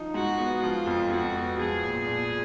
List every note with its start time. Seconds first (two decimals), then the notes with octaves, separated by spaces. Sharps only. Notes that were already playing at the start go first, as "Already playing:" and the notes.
Already playing: F3 D#4
0.14 G#2 F#4
0.38 B3
0.63 F3 F4
0.86 F2
1.10 F2 F#4
1.35 B3
1.59 F3 G#4
1.83 A#2
2.07 A#2